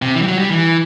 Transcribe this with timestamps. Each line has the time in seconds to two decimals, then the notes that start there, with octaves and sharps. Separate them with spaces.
0.02 C3
0.15 E3
0.22 G3
0.27 F#3
0.38 G3
0.51 E3